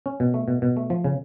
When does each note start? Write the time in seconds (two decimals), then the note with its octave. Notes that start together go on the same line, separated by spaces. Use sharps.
0.06 C#4
0.20 B2
0.34 A3
0.48 B2
0.62 B2
0.77 A3
0.90 F3
1.04 C#3